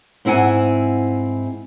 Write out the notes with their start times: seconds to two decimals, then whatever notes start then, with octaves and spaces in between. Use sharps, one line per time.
0.25 G#2 C4 E4 F#5 G#5